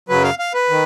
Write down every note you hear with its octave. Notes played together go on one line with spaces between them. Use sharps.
F#2 C#3 F#3 B4
F5
F5
B4
D#3